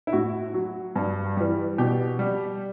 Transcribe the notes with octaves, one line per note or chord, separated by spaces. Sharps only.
E4
A2 F#4
F#3
G2
E3 G3
B2 G4
G3